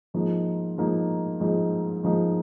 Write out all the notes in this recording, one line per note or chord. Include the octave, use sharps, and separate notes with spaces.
G#2 F3 A#3 D#4
G#2 F3 A#3 D#4
G#2 F3 A#3 D#4
G#2 F3 A#3 D#4